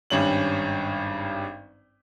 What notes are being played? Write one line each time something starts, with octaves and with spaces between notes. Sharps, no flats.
G#1 G2 C#4 F#7